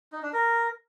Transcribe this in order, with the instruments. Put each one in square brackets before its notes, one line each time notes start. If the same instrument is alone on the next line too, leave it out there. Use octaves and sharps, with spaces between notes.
[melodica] D#4
D4
A#4